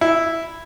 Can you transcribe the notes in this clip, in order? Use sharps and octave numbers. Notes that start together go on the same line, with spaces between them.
E4